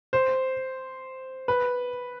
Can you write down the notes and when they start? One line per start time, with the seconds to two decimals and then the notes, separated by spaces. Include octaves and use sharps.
0.13 C5
1.48 B4